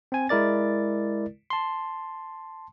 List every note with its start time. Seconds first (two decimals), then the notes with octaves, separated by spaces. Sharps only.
0.12 C4 G#5
0.29 G#3 E4 A#4 D5 A6
1.50 A5 C6